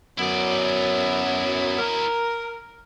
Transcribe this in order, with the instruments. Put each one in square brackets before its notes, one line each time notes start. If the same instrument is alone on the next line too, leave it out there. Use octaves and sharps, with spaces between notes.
[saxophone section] F#2 [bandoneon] F#3 B3 [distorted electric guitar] E4 D5
[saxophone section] A#4